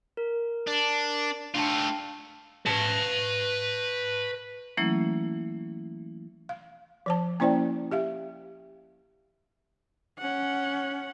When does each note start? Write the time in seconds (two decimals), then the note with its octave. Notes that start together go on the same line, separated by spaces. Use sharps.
0.17 A#4
0.68 D4
1.55 A3 D4 F4 G5 A5
2.66 B4 A5
4.77 E3 F#3 A3 A#3 C#4 E4
6.49 F5
7.06 F3 C5 A5
7.40 A#3 C#4 E4 C5 D5 G5
7.91 G4 E5 F5
10.19 C#4 F#5